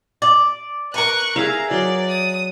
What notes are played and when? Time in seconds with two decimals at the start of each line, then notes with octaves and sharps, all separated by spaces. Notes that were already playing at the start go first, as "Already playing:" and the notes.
0.22 D5
0.94 A#4 B4 C#6 F#6
1.36 G#4 E5 F5 A#5
1.71 F#3 D5
2.09 D#6